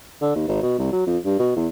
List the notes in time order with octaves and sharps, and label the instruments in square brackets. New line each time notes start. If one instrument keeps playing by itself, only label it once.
[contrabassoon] D3
D#2
G#1
B2
C2
F#3
F2
G2
B2
E2